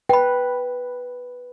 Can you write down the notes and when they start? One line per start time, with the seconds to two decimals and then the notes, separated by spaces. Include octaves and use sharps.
0.09 B4 G5 B5